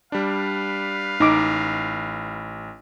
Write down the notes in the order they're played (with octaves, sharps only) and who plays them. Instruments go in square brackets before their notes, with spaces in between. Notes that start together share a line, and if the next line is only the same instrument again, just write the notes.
[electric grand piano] G3 D4 [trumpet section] B4 F5
[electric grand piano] A1 [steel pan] D#4 D6